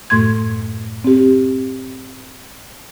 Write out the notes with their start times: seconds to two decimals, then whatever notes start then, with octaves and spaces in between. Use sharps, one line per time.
0.10 F#2 A2 A3 C6 G#6
1.04 C4 G4